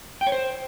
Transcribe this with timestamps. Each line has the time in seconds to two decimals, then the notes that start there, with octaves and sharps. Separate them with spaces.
0.21 G5
0.27 C#5
0.32 C5